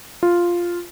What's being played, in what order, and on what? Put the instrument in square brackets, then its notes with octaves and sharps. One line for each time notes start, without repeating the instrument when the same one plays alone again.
[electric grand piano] F4